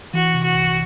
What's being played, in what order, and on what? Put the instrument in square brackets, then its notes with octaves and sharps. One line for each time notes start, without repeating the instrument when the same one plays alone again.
[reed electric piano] E3 [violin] F#4
[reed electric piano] C3
[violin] F#4
[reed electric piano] C2